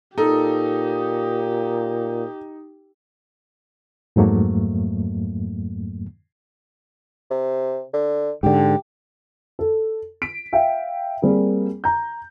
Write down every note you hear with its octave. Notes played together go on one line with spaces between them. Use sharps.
A#2 D#4 G4 A4
F2 G#2 F#3 A3 A#3
C3
D3
G#2 D3 G4
A4
B6 D7
E5 F5 G5
G3 A#3 C4 G#4 A#4
A#5 G6